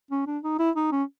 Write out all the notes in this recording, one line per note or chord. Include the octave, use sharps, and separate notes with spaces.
C#4
D4
D#4
E4
D#4
C#4